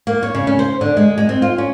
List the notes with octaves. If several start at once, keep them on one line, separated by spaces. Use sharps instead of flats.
A#3
C#5
C#3
C#4
C5
D3
G#3
G#3
C4
F4
C#4